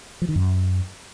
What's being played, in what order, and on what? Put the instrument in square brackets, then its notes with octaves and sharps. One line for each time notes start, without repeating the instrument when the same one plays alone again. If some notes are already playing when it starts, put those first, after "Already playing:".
[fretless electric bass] F3
D#3
F#2